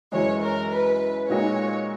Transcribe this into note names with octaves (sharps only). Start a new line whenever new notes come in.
F#2 E3 G#3 C#5
A#4
B4
A#2 G#3 D#4 F#4 C#5